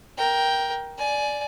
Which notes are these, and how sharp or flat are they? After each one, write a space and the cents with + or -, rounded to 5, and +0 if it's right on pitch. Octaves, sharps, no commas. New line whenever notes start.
A#4 +15 G5 +0
D5 +0 G#5 +20